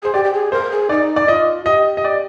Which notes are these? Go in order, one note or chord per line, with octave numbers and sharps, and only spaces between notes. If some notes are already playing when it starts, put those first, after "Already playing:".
G#4 C5
G4 D5
G4
G#4
A#4 C5
G#4
D#4 D5
D5
F4 D#5
G4 D#5
D#5
D5